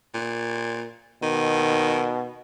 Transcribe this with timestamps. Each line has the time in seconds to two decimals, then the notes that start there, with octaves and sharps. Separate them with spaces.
0.14 A#2
1.23 B2 D#3